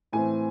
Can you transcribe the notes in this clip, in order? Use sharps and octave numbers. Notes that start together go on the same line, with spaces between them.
A2 E3 C4 G#5